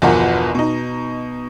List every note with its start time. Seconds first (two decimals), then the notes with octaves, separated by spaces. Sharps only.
0.02 G1 E2 B2 F3 A#4 F#5
0.55 B2 D#4